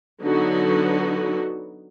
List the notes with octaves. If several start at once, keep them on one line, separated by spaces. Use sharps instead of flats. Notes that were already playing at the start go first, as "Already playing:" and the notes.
D3 F#3 B3 D#4 F#4